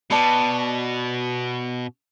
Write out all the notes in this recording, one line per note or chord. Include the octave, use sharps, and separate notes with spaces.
B2 B4 D5 A5